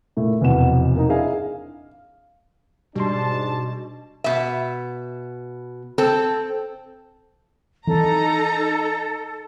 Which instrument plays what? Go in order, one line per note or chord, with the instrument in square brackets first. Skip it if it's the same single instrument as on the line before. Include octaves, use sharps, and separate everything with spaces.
[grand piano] A#2 A3 E4
F1 E2 B2 F#4 F#5 E7
A#3 D#4
D4 E4 G#4 D#5 F5 G#5
F5
[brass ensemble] G#2 D4 A5 [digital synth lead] B2 [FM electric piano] G3 C6
[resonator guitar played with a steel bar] B2 E5
C4 A4
[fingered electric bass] E3 C4 [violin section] D#4 A#5 [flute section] A4